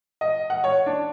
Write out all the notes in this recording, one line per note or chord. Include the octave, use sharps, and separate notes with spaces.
D#5
F#5
C#5
D4